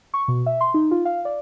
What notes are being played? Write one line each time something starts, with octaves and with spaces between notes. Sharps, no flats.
C#6
B2
E5
C6
D#4
F4
F5
D5